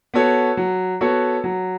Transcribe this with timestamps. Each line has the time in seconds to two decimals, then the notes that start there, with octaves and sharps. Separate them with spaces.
0.14 B3 F#4 A4 C#5
0.57 F#3
1.01 B3 F#4 A4 C#5
1.44 F#3